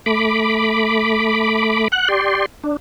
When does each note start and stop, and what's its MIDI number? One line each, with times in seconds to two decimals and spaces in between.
0.06 1.88 57
0.06 1.88 83
0.06 1.88 86
1.92 2.08 78
1.92 2.08 90
2.08 2.46 67
2.08 2.46 74
2.08 2.46 84
2.64 2.77 62